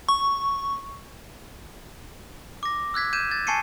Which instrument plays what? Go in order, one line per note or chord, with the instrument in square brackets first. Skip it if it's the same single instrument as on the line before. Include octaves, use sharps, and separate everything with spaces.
[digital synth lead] C#6
[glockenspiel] D6 A#6
E6 F#6 G#6 B6
G6 G#6 D#7 E7
G#6 A6
G#5 A5 C#6 C7 C#7 D#7